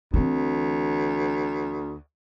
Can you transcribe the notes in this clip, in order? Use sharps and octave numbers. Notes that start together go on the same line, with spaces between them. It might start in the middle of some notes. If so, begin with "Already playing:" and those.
D2 E3 C4